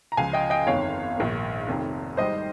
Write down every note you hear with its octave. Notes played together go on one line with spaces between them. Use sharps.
A#5
C#2 C#3 F3 F5 G#5
D#5 G5
D#5 G5
G1 F2 D#3 C#5 F5
A#1 G#2 D#3 A#3
F1 F2 D#3
G#1 G#2 G3 C5 D#5